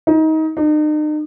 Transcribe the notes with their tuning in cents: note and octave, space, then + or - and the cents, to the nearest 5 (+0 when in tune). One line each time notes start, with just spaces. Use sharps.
D#4 +25
D#4 -40